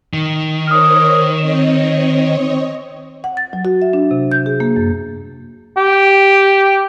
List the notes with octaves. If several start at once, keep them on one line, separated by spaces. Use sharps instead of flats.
D#3
A#4 C5 C#5 D#6 F6
C4 C#5 D#5 E7
F#5
A6
F#3
F#4
E5
D4
C3
G6
G#4
A#3
F#2
G4